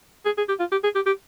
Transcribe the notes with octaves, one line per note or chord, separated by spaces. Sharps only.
G#4
G#4
G4
F4
G4
G#4
G4
G4